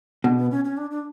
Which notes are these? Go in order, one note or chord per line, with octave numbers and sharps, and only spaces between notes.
B2 D4
B3
C#4
C#4
D4
D4